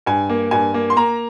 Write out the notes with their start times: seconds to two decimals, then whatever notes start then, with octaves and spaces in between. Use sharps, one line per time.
0.06 G2 G#5
0.29 A#3
0.51 G2 G#5
0.74 A#3
0.90 C6
0.96 A#3 A#5